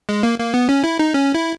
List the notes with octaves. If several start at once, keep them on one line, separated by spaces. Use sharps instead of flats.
G#3
A#3
A#3
B3
C#4
E4
D#4
C#4
E4